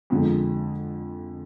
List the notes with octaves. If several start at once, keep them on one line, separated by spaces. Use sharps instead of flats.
F2 D3 G#3